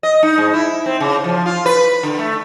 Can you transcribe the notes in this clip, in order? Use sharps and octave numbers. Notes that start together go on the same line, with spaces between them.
D#5
D#4
G#2
E4
C4
C#3
F3
F4
B4
D3
A3